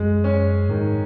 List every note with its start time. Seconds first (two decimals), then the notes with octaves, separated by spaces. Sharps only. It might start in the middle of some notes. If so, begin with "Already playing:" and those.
Already playing: F#2 G#3
0.24 C#4
0.69 G#2 D#3